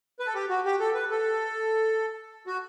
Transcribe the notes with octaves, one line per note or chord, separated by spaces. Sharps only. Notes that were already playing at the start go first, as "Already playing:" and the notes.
B4
A4
G4
F#4
G4
A4
B4
A4
F#4